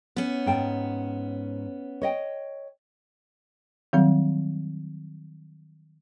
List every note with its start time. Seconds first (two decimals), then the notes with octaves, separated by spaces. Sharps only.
0.16 B3 C#4
0.46 G#2 G5 A5
2.02 C#5 D#5 G5
3.93 D#3 F#3 G3 C4